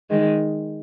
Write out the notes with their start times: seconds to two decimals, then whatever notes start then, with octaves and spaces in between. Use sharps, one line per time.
0.10 D#3 G#3